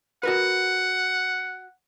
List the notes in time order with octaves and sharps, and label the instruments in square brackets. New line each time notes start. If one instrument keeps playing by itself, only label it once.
[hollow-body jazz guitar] F#4 A#4 B4 [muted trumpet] F#5